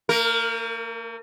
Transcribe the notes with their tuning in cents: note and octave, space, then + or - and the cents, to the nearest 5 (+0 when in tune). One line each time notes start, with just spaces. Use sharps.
A#3 -45 A#4 +0